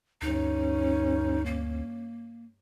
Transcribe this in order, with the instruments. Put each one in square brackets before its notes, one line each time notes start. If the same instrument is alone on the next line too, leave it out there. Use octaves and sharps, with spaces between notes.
[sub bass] D2 [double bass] G2 C#4 [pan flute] D#4
[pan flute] A#3